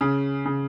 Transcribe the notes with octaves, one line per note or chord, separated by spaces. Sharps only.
C#3
C#3